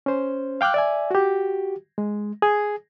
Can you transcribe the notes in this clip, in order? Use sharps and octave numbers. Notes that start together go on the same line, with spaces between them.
C#4 C5
F5 G5 D6 F6 F#6
D5 E5 G#5
F#4 G4
G#3
G#4